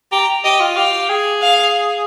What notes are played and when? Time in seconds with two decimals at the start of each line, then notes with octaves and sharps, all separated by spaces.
0.11 G4 A#5
0.44 G4 D#5
0.60 F4
0.76 G4 F5
1.09 G#4
1.42 F5